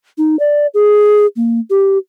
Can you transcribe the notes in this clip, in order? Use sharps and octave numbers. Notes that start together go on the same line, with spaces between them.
D#4
D5
G#4
A#3
G4